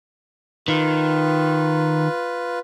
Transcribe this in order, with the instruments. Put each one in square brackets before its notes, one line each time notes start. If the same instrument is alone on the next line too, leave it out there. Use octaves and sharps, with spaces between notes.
[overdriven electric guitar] D#3 [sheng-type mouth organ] F4 B4